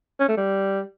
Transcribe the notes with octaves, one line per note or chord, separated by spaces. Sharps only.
C#4
A3
G3